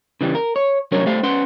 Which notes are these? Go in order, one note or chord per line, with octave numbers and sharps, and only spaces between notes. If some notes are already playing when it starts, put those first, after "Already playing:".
C#3 E3 G3
A#4
C#5
C2 F#3 C#4 D4 A#4 C#5
G3 A3 C5 F5
C#4 B4 F#5 C6